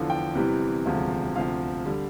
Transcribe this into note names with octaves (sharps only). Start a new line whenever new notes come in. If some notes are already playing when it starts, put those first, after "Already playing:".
Already playing: E2 D3 F3
G5
E2 C3 E3 G3
E1 D2 C3 F3
D2 C3 F3 F5
D3 G3